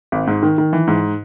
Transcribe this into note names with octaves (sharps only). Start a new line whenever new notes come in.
G#1
G#2
D#3
D#3
E3
G#2